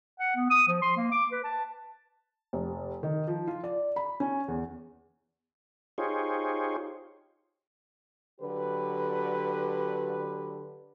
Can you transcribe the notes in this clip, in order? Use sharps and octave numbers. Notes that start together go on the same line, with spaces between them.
F#5
B3
D#6
F3
C6
A#3
D6
B4
A5
F1
D#3
F3
F4
D5
B5
C#4
E2
D#4 F4 G4 G#4 C5 C#5
D3 F#3 G4 B4